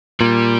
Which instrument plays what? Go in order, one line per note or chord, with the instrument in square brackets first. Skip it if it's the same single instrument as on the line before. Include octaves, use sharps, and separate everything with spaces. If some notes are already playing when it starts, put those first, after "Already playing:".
[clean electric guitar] A#2 [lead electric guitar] G3